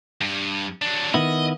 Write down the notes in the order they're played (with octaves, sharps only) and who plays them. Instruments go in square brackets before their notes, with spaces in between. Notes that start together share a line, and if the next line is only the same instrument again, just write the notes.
[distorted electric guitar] G2
F#3 D4
[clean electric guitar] D#3 B3 E4 [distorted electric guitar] D#5